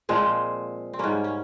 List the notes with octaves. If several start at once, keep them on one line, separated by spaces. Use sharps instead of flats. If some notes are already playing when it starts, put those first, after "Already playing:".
A#2 F3 G#3 C4
C4
G#2 G3 A#3 C#4
C#4